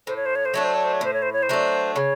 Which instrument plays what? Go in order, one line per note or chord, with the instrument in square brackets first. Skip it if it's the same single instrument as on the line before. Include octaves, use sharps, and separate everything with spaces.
[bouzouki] A2 [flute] C5
[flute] C#5
C5
C#5
C5
[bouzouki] F#3 A3 D4 [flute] C#5
[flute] C5
C#5
C5
C#5
[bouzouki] A2 [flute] C5
[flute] C#5
C5
C#5
C5
[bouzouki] F#3 A3 D4
[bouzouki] C#3 [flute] C#5